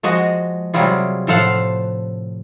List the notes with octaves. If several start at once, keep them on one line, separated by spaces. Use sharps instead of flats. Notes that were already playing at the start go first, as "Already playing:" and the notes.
F3 G#3 F#4 D#5
C3 F#3 G3 E4 F4 G#4
A2 F3 A4 C5 F5 F#5